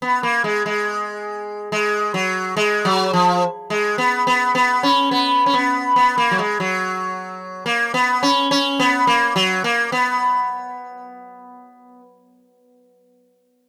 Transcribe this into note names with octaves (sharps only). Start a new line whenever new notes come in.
B3
A#3
G#3
G#3
G#3
F#3
G#3
F#3
F3
G#3
B3
B3
B3
C#4
B3
C#4
B3
B3
A#3
F#3
G#3
F#3
A#3
B3
C#4
C#4
B3
A#3
F#3
A#3
B3